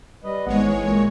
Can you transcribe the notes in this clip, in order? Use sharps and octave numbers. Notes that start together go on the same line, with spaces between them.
G3 B4 D#5
G#1 G#2 G#3 B3 C#5 F#5
E3
A#2